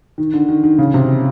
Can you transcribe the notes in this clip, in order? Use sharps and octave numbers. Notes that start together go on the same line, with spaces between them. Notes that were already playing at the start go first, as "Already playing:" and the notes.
D#3
D3
D#3
D#3
C#3
C3